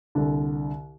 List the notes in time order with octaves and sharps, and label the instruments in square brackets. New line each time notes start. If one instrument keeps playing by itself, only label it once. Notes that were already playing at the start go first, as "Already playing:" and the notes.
[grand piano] C2 D3